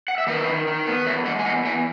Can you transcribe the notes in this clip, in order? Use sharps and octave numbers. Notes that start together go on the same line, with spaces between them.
F#5
E5
D#3 B4 D#5
D#3
D#3
B3
E2 C#5 E5
G#3 D#5 F#5
G#5
E2 D#5 F#5
E2 E5 G#5